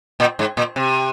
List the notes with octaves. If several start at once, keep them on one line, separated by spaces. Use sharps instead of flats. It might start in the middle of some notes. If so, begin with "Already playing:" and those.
A#2
G#2
A#2
C3